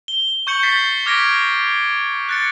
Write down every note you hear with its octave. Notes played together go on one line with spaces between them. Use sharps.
G7
C#6 G6 C#7 F#7
G6 A6 B6 C7
D6 F6 G#6 A#6 B6 D7
F#6 A6 C#7